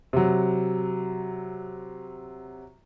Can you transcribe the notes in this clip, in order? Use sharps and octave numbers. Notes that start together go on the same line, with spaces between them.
C3 F#3